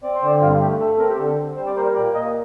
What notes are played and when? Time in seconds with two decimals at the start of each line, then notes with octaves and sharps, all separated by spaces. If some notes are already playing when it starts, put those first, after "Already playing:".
0.03 C4 D5
0.15 C5
0.23 D3 D5
0.41 G2 F4
0.61 A3 G4
0.79 A3 A4
0.99 C4 A#4
1.09 G4
1.18 D3 A4
1.38 C4
1.56 G3 C5
1.66 D5
1.76 A#3 C5
1.86 A#4
1.95 A#2 D5
2.14 A#2 D#5